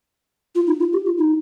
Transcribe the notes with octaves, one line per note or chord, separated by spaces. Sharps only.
F4
D#4
F4
G4
F4
D#4